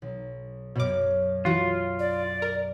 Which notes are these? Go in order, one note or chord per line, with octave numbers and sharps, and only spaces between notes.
B1
F#2 B2 C#5 D6 F6
E3 F4 F#4
D5
A#4